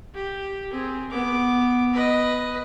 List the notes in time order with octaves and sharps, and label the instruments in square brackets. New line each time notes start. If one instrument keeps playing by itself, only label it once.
[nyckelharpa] G4
C4 G#4
B3 D6
B4 D#5